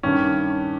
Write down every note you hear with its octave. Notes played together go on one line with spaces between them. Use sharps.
G2 D#3 C#4